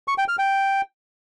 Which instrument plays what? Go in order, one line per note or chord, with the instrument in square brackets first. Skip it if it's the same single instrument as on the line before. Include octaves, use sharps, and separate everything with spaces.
[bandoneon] C#6
G5
F6
G5